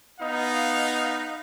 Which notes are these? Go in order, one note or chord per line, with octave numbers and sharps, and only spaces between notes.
B3 D#4 D#5 F5